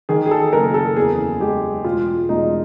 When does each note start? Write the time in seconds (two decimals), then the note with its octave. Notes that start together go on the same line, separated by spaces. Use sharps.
0.09 D#3 G#4
0.26 G#4
0.31 A4
0.53 F#1 A#4
0.74 A4
0.97 E2 G#4
1.40 G#3 G4
1.84 E1 F4
2.29 E1 D#4